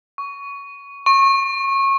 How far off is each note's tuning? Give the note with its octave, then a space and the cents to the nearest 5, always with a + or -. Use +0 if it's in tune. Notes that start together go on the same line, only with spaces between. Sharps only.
C#6 +15
C#6 -25